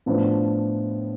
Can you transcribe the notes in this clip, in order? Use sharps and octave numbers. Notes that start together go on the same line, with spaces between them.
A2 F3 B3 D4 F4